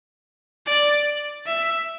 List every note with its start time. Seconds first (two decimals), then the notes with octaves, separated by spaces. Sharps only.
0.67 D5
1.47 E5